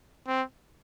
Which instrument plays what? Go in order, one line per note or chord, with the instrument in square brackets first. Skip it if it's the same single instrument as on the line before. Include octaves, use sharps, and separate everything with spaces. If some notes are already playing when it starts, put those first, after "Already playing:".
[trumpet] C4